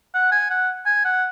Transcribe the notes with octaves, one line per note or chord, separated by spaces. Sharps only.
F#5
G#5
F#5
G#5
F#5